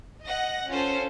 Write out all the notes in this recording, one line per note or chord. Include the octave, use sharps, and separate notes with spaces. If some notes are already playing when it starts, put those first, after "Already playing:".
D#5 F#5 A#6
C#4 F4 A4 C5